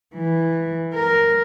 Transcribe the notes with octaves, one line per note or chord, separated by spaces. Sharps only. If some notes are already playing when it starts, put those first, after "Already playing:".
E3
A#4